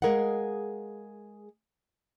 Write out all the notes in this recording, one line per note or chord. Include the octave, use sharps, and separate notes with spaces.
G#3 G#4 A#4 D#5 F5 F#5